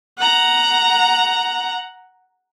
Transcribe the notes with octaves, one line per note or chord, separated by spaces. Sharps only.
F#5 A#5